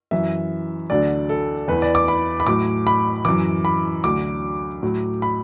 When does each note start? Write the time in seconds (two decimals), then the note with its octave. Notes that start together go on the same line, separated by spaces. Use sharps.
0.11 F#2 E3 E5
0.90 D2 D3 F#3 D5
1.29 A4
1.68 E2 E3 B4
1.82 D5
1.95 D6
2.08 B5
2.40 B5
2.47 A2 F#3 D6
2.87 B5
3.25 F#2 E3 D6
3.65 B5
4.04 D2 D3 F#3 D6
4.83 A2 F#3
5.22 B5